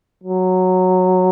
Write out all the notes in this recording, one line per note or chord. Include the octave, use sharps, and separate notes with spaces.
F#3